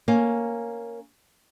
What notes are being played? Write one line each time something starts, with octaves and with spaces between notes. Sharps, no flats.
A#3 C#4